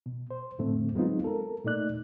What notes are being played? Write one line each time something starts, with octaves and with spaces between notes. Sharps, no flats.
B2
C5
F2 A2 D3 A3 C4
F#3 G#3 B3 C4 D#4 F4
A4 A#4
A#2 A3 D#4 D5 F#6